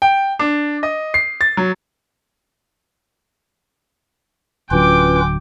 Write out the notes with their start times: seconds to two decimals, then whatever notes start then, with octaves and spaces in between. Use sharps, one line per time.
0.02 G5
0.39 D4
0.83 D#5
1.14 C7
1.41 A6
1.57 F#3
4.71 D1 D3 F#3 C#4 F4 B4 G5 D6